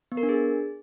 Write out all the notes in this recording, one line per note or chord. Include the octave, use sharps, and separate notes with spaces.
B3
A#4
D4
G#4